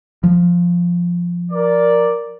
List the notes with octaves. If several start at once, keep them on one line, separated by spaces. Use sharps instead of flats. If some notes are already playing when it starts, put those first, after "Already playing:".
F3
A#4 D5